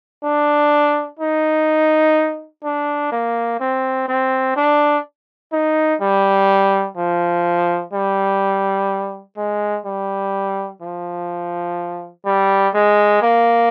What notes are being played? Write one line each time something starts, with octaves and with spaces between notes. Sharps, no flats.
D4
D#4
D4
A#3
C4
C4
D4
D#4
G3
F3
G3
G#3
G3
F3
G3
G#3
A#3